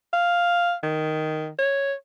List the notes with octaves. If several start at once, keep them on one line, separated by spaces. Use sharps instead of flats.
F5
D#3
C#5